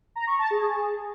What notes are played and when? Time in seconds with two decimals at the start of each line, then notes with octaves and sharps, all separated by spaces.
0.16 A#5
0.27 C#6
0.39 A5
0.51 G#4